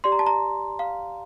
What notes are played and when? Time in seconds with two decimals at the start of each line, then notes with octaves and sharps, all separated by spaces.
0.04 G4 D5 C6
0.12 A#5
0.19 A5
0.27 A#5
0.79 F5